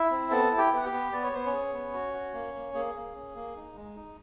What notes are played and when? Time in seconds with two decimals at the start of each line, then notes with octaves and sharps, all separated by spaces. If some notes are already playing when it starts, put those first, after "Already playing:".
Already playing: E4 E5
0.11 C4
0.31 B3 A4 A5
0.51 E4
0.58 G4 G5
0.72 B3 F#5
0.85 G4 G5
0.92 B3
1.12 B3 D5
1.23 C#5
1.32 B3 C5
1.46 C#4 C#5
1.53 G#4
1.74 B3
1.93 F#4
2.14 F#4
2.34 A#3
2.54 A#3
2.74 A#3 G#4
2.95 A#3
3.15 C#4
3.35 A#3
3.56 D#4
3.76 G#3
3.96 D#4